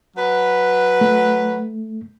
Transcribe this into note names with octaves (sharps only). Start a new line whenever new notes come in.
F#3 B4
A3